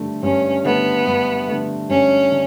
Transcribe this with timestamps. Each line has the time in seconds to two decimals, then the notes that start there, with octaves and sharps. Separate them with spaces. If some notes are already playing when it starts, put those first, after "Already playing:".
Already playing: G2 D3 A3
0.23 G2 C#4
0.64 D3 A3 B3
1.06 G2
1.48 D3 A3
1.89 G2 C#4
2.32 D3